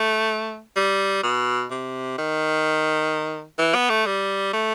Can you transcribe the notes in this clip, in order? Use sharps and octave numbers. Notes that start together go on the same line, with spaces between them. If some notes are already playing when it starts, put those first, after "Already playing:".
Already playing: A3
G3
B2
C3
D#3
E3
B3
A3
G3
A3